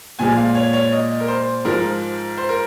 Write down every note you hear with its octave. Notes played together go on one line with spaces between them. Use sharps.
A#2 F3 G#3 G#5
F5
C#5
C#5
D#5
A#4
C5
G#2 F3 G#3 A#4
C5
A#4